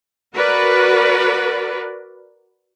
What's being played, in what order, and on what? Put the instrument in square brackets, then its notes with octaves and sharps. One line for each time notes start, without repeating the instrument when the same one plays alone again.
[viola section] F#4 A#4 B4 D5